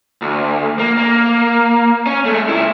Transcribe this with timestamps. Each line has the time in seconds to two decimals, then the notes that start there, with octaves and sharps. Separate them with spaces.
0.22 D2
0.79 A#3
0.97 A#3
2.06 C#4
2.25 G#3 A3
2.49 C#2 E4